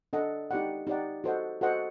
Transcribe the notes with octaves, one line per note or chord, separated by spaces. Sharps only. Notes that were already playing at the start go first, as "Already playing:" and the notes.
D4 A4 D#5 F#5
D#4 G4 D5 F#5
D#4 G4 D5 F#5
F#4 A4 C5 D#5 F#5
F#4 A4 C5 D#5 F#5